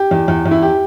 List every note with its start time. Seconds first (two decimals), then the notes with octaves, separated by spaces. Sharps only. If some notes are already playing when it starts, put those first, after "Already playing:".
Already playing: G4
0.11 E2
0.28 E2
0.46 E2
0.51 E4
0.62 G4